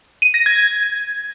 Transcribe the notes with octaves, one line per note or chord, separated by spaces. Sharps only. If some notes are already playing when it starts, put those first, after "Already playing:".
D#7
A#6
G#6